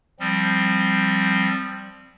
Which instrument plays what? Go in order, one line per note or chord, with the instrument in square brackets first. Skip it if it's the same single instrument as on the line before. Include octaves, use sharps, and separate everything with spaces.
[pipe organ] F3 G3 C4